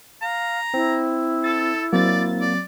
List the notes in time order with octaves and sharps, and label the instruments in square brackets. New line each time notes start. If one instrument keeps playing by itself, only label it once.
[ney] F5 [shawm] A#5
[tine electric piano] C4 [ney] E4
[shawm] A4 [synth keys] A6
[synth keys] F#3 C4 A6 [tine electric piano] A#3 [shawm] D5
[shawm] D5